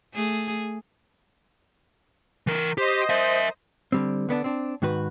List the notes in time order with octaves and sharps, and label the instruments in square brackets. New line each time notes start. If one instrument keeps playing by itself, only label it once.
[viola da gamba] A3 G#4
[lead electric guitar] E3 A#4
[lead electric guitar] G4 [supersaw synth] C5 D#5
[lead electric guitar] A#4 E5
[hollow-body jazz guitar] D3 G3 C4
D3 B3 D4
C4 D4
G#2 D#3 F#4 B4